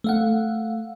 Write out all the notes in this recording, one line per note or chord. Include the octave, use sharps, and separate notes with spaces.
A3 F5 F#5